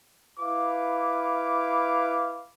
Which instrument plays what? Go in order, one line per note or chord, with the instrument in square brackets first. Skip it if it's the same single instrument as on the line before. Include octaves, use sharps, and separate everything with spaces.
[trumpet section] E4 B4 F5 D6